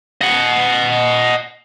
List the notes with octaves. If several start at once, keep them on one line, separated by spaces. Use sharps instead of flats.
D#5 F#5